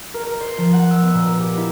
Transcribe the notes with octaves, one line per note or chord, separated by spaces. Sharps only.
A#4
A#4
C5
F3
F#5
E6
B3
A#2
A#4
G4
E4